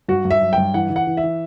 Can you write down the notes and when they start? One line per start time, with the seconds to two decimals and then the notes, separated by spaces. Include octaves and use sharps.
0.08 G2 F#4
0.25 G2
0.31 E5
0.41 F#3
0.53 G5
0.58 G2
0.74 E3 F#5
0.90 E3
0.96 F#5
1.07 E3
1.17 E5
1.23 E3